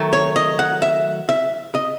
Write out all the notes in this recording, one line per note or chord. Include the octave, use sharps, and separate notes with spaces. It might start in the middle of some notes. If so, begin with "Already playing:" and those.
Already playing: D#3 F#3 A3
C#5
D#5
F#5
E5
E5
D#5